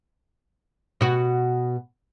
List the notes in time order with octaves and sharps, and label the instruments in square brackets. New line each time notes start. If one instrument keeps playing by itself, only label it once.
[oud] B2 F#4